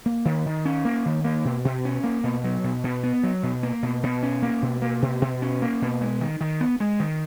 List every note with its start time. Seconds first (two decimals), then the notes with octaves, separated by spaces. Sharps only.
0.06 A#3
0.25 D#3
0.46 D#3
0.65 C#4
0.85 A#3
1.05 D#3
1.24 A#3
1.45 B2
1.65 B2
1.85 C#4
2.04 A#3
2.24 B2
2.44 F#3
2.64 B2
2.84 B2
3.03 B3
3.23 F#3
3.43 B2
3.63 A#3
3.83 B2
4.03 B2
4.23 C#4
4.42 A#3
4.62 B2
4.82 A#3
5.02 B2
5.22 B2
5.42 C#4
5.62 A#3
5.82 B2
6.01 G#3
6.21 D#3
6.41 D#3
6.61 B3
6.80 G#3
7.00 D#3